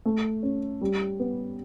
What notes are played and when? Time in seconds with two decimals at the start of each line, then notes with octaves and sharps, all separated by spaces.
0.05 A3
0.43 C#4
0.81 G3
1.19 B3